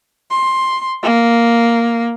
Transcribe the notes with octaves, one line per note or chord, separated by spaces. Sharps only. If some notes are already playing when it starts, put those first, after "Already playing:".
C6
A#3